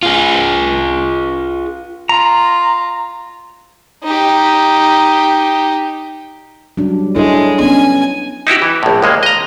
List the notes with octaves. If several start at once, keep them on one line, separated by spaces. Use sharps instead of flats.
F4 G#4
F4 A#5
D#4 G4
F#3 G3 D4
G#3 D4 E4 A4 C#5
B3 C#4 G#5
D#4 E4 F#4 G4
E3
A#1 A2
D#2 G#3 A#3
D#5 A#5